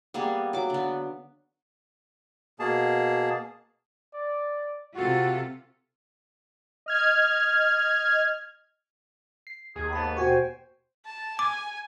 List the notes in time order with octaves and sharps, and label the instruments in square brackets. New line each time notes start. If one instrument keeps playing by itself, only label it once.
[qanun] G3 A#3 B3 G#4
F#3 D6
D3 B3
[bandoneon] B2 A#3 G#4 A5
[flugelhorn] D5
[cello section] C3 F4 A4 [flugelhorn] F#4
[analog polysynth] D#5 F6 G#6
[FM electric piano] C7
[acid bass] D#2 [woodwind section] G#4
[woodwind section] G#2 A#3 B3 [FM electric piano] A5 B5
[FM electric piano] B2 F#4 C#6 [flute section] C5 G5 [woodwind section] G#5
[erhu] A5
[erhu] G#5 [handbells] D6